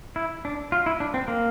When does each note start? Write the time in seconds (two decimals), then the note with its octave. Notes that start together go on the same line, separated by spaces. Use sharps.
0.16 E4
0.45 D4
0.72 F4
0.86 E4
1.00 D4
1.14 C4
1.28 A#3